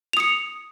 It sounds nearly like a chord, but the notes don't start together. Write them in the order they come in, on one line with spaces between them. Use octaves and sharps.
F7 D#6 C#7